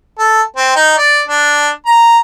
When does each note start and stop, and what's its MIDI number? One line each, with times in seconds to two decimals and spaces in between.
0.18 0.42 69
0.56 0.71 60
0.76 0.94 63
0.98 1.22 74
1.28 1.69 62
1.86 2.19 82